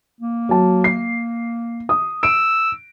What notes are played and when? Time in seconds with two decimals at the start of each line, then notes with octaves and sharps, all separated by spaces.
0.21 A#3
0.49 F#3 A5
0.84 C7
1.89 D#6
2.23 E6 D7